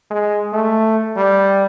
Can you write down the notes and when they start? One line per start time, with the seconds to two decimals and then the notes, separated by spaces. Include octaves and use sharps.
0.11 G#3
0.53 A3
1.16 G3